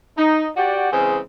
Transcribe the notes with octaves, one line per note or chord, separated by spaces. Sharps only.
D#4
F#4 G4 D5
C#3 E3 G#3 C4 C#4 G#4